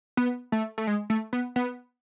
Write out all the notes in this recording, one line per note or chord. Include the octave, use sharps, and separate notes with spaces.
B3
A3
A3
G#3
A3
B3
B3